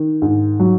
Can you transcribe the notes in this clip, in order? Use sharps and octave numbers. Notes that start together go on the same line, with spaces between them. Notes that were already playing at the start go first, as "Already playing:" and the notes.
Already playing: D#3
G#2
F#3